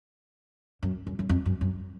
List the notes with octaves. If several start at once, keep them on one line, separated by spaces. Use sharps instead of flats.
F#2
F#2
F#2
F2
F#2
F#2